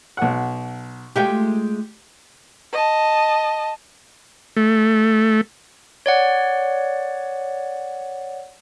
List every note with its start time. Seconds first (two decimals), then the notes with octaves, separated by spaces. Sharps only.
0.17 B1 F#5
1.16 G#3 A3 F4 G4 G5
2.72 D#5 A5
4.57 A3
6.06 C#5 D5 F#5